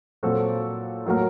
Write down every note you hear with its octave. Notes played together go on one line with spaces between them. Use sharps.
A#2 F#3 C4 F#4 A4
A2 F#3 A#3 F#4 A#4